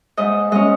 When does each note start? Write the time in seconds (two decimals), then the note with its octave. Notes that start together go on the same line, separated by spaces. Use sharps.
0.17 G#2 D#5
0.52 G#3 C#4 D#5